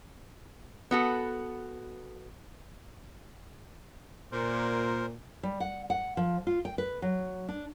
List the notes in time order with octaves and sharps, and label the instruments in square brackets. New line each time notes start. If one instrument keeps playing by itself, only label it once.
[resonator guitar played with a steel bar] B3 F#4 A4
[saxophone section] A#2 [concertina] A#4 C5
[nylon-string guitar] G3
F#5
F#5
F3
F4
G5
B4
F#3
D4